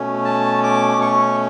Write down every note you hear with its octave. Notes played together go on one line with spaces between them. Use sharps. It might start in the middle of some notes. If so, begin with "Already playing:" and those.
Already playing: B2 A3 C#4
A5
D6
C#6